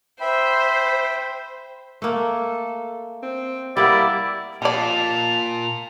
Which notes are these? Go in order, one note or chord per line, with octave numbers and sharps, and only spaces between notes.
C5 E5 G5 B5
A3 A#3 A4
C4
G3 A#3 B3 E4 G4 D5
A#2 F3 D5 A5 F7